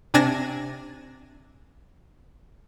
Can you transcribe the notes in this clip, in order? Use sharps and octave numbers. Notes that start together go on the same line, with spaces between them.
C3 D4 G#5 A6 A#6 E7